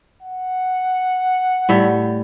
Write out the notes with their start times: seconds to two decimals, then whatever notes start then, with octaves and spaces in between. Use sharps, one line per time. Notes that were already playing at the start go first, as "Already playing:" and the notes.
0.22 F#5
1.69 A2 G3 E5